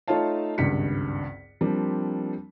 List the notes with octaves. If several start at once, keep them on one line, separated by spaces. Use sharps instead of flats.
A3 D#4 F4 C#5 F5 A5
G#1 C#2 G2 B6 C#7
F3 G3 A#3 C4 D4